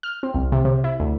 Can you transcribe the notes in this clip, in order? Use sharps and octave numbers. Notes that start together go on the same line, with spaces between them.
F6
C4
C2
C3
C3
E4
D2